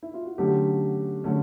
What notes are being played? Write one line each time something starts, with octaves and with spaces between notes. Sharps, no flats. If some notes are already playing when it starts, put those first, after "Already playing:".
E4
F4
F#4
D3 F#3 A3 C#4 G4
D3 F#3 A3 C#4